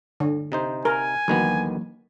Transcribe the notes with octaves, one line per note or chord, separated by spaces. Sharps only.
D3
C3 D#4 C5
A#4 G#5
D2 D#3 E3 F#3 A#3 B3